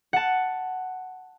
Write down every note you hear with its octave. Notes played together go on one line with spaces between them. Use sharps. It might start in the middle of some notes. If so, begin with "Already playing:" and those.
F#5 A5